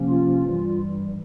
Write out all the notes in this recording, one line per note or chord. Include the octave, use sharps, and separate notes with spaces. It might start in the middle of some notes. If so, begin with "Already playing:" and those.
Already playing: C3 F3 A#3 C#4
F4
G2 E3 G3